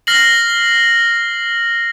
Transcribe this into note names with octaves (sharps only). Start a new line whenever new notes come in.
F6 A#6 C7 F#7